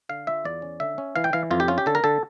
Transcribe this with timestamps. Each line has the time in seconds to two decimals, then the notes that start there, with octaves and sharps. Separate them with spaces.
0.09 D3 F5
0.27 F4 E5
0.44 E2 D5
0.62 C#4
0.80 D3 E5
0.98 C#4
1.16 E3 F5
1.24 G5
1.33 E3 F5
1.51 F2 F4
1.60 G4
1.68 C#4 F4
1.78 G4
1.86 D3 A4
1.95 A#4
2.04 D3 A4